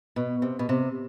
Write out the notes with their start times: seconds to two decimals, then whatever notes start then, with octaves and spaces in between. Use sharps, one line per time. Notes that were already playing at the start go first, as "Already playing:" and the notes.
0.16 B2
0.42 C3
0.59 B2
0.69 C3